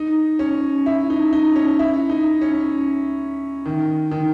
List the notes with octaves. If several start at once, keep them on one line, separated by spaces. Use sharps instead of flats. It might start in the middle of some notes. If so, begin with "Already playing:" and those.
Already playing: D#4
C#4
E4
D#4
D#4
C#4
E4
D#4
C#4
D#3
D#3